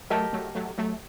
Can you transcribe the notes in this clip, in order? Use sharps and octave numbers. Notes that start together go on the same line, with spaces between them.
F#3 A3 G4 A#4 D#5 A5
F#3 A3
F#3 A3
F#3 A3